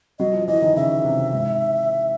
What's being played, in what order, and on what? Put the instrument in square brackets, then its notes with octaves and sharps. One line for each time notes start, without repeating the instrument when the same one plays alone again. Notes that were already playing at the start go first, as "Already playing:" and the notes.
[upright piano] F#3 [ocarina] D#5
[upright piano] F3
[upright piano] E3 [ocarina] D#5
[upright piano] D#3
[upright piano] C#3 [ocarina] E5
[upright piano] C3
G#2